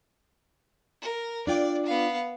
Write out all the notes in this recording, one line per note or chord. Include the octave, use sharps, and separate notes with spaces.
A#4
D4 F4 D5 G5
B3 F5